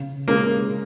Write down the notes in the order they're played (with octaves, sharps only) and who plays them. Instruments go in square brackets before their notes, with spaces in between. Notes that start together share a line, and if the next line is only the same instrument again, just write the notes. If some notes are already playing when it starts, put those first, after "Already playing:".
Already playing: [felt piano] C#3
[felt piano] G#3 C#4 G#4 [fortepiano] A#3